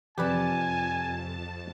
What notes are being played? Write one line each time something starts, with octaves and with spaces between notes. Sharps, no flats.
F2 C3 F3 G4 B4 D5 G#5 A5